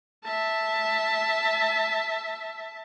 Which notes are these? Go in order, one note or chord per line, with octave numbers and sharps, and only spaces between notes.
E5 A5